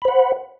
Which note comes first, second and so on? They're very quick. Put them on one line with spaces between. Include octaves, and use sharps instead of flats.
B5 C5 F#5